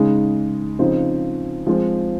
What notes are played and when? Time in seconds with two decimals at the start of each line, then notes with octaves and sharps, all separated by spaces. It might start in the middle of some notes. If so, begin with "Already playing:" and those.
Already playing: C#3 G#3 D#4
0.79 C#3 F3 C4 D#4
1.67 F3 G#3 C4